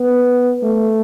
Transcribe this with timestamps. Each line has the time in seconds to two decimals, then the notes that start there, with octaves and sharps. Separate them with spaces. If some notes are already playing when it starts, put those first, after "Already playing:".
Already playing: B3
0.64 A3